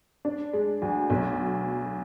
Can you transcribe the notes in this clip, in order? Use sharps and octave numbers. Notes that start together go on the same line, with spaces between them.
D4
G#3
D2
B1